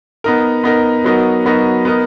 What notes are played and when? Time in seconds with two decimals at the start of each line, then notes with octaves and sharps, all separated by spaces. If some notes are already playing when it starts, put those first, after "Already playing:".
0.24 B3 D#4 A#4
0.64 B3 D#4 A#4
1.04 F#3 B3 D#4 F#4 A#4
1.45 F#3 B3 D#4 F#4 A#4
1.85 B3 D#4 A#4 D#5